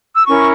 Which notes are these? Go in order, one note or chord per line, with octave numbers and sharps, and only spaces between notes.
E6
C#4 E4 A#4 C#6